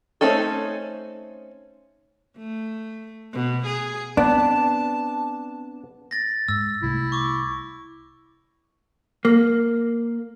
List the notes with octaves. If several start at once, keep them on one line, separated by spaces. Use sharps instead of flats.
A3 C4 C#4 D#4 A4
A3
B2
G#4
B3 C4 D4 A5
A6 A#6
G#2 E6
C2 A3 E4
C#6 D6
A#3